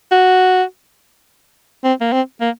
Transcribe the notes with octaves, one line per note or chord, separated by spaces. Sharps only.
F#4
C4
A#3
C4
A#3